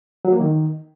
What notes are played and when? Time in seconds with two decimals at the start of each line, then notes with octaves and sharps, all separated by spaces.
0.25 F#3
0.33 A#3
0.40 D#3